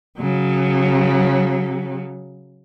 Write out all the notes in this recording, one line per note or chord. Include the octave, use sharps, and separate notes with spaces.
C#3 F#3